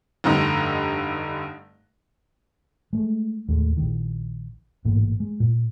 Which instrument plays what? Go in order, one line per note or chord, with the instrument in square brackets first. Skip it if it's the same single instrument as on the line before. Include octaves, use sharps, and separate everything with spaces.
[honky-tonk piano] F1 G2 D3 D#4
[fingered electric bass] G#3 A3
D1 D#2 G#3 A3
A#1 D#3
A1 G#2 B2 A#3
G#3
A#2